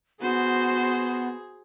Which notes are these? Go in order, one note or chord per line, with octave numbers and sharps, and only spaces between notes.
B3 F#4 G#4 C5